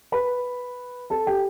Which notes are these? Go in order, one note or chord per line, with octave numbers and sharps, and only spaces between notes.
B4 B5
A4 A5
G4 G5